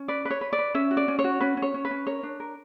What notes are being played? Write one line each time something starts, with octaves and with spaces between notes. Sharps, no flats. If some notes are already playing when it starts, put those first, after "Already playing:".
Already playing: C#4
B4 D5
B4
C#5
B4
D5
B4
C#4 E5
F#4
D5
C#4
C#5
F#4
C#4 B4
C#4
C#5
C#4
B4
C#4
A#4 C#5
D4
A#4